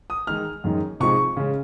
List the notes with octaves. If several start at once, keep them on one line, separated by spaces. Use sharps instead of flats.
D#6
D#3 G#3 D#4 F6
F#2 D#3 G#3 D#4
C3 F3 G#3 D#4 C#6
C#3 G#3 C#4